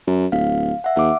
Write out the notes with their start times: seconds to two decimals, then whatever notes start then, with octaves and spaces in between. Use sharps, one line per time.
0.07 F#2
0.32 D1 F5
0.84 E5 F#5
0.96 D#2 E5 D6